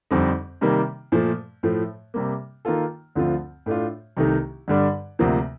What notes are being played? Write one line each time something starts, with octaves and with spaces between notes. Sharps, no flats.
F2 D3 G3 C4 D#4
C3 D#3 G3 A#3
A#2 F3 A3
A2 F3 A3
C3 G3 A#3
D#3 A#3 F4 A4
D2 D3 F3 C4 F4
A2 A3 D4 F4
C2 C3 D#3 A3 D#4
G2 D3 G3 D4
D2 C3 F3 A#3